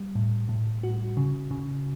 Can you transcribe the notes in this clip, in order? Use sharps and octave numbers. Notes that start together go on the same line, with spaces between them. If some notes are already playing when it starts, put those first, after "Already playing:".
Already playing: G3
A2
A2
F#4
C#3
C#3